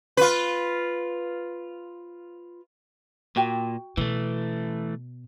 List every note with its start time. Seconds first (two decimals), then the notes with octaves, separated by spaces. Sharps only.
0.17 F4 B4
3.36 A#2 F#4 G5
3.97 B2 E3 A3